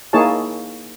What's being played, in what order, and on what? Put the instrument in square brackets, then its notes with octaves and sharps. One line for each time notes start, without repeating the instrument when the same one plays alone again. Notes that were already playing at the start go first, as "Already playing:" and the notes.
[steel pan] A#3 D#4 E4 G#4 C#5 A5